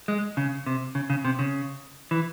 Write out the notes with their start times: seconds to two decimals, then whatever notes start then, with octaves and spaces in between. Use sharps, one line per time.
0.08 G#3
0.37 C#3
0.66 C3
0.95 C#3
1.10 C#3
1.25 C3
1.39 C#3
2.11 E3